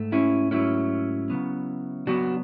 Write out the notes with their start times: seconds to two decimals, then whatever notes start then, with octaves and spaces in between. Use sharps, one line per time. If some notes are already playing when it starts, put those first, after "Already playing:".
Already playing: G#2 A3
0.12 C#4 E4
0.51 G#2 F#3 A3 C#4 E4
1.30 C#3 F#3 B3
2.07 C#3 F#3 B3 D4 F#4